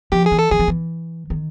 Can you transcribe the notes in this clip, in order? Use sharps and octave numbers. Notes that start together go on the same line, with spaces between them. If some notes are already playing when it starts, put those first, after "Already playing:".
F3 G4
G#4
E3
A4
E3 G#4
F3
E3
D#3